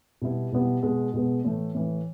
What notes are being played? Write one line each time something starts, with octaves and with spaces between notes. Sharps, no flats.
B2 G3 B3 E4
B2 G3 B3 E4
B2 G#3 B3
B2 G#3 B3
A2 E3 A3
A2 E3 A3